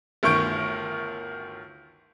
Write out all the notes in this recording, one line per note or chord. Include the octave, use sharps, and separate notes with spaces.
G1 D2 D#3 C#6 G6 D7